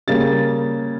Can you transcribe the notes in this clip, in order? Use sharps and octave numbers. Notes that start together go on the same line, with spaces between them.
C#3 G3 A#3 A6